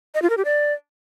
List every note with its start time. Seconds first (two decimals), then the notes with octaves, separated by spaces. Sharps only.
0.15 D#5
0.22 F4
0.30 A#4
0.37 G4
0.45 D5